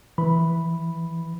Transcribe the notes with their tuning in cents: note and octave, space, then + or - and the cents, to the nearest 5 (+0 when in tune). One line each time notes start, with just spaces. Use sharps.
E3 +0 B5 +0